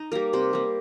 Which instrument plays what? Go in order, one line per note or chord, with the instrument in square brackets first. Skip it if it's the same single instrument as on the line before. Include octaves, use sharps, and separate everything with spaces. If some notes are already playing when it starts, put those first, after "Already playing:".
Already playing: [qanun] D#4
G3 A#3 A#4
C3 C5
G3 A#3